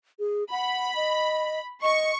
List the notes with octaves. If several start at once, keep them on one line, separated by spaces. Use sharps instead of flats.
G#4
F#5 B5
D#5
D#5 C#6